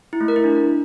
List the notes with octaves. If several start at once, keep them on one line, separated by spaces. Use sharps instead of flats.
E4
A3
A#4
E4
D4